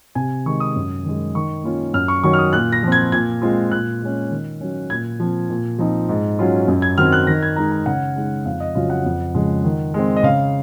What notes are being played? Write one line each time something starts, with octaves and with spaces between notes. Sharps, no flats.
C3 G#5
D#3 G#3 C#6
D#6
F#2
D#3 G#3
D#3 C#6
A#3 C#4 F4
F#2 F6
C#6
D#3 F#3 C#4 C#6
F6
D#6
A#2 F#6
A#6
F3 C4
G#6
A#2 G#6
G#3 C4 F4
A#2 F#6
G#3 C#4
D#3
F#3 C#4
A#2 G#6
F3 C4
A#2
F3 C4 D#4
G#2
F#3 C#4 F4
F#2
G#6
D#3 F#3 C4 F6
F#6
D#3 A#6
G#6
G#3 D#4 A#5
A#5
C#3 F#5
G#3 D#4
F2 F5
D#5
C#3 F#3 C#4 F4 F5
F#5
F2
C#3 F3 G#3
D#3
G#3 C4
D#5
C#3 F5